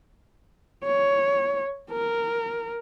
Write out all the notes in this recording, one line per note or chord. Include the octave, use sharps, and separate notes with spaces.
C#5
A#4